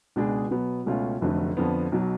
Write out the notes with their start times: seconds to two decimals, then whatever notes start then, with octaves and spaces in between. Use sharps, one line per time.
0.16 C#2 B2 G#3 D4 G#4
0.51 B2 F#3 B3
0.86 C#2 B2 A3 C#4 F4
1.21 F1 F2 D3 F#3 A3
1.57 F2 D3 F3 B3
1.92 B1 B2 F#3